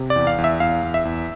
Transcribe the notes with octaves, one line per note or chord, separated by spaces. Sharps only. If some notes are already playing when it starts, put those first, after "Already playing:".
Already playing: C3
D5
E2
F5
E2
E5
E2 F5
E2
E5
E2